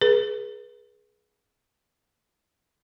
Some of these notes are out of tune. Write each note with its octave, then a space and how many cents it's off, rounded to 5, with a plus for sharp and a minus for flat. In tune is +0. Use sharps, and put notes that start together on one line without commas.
G#4 +15 B4 -35